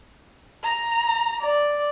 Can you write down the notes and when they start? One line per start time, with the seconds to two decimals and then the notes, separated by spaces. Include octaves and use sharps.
0.63 A#5
1.41 D5